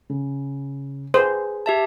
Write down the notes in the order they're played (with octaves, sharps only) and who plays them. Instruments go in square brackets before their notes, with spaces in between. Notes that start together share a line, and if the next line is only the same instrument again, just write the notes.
[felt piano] C#3
[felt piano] G#4 B4 G#5 [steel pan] C5
[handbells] G4 E5 A5